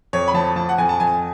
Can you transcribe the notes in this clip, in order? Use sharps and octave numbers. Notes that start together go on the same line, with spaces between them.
F2 C#5
B5
F3 A5
F3 A5
F#5
F2 G#5
A5
F2 G#5